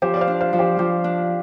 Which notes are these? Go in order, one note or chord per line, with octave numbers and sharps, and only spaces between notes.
F3 G4 C5
D5
C5 F5
D4
C5 F5
F3
G4 C5
F3 G4
D4